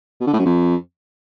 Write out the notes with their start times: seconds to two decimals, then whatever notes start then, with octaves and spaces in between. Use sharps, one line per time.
0.21 B2
0.27 D3
0.33 A2
0.39 F#2
0.46 F2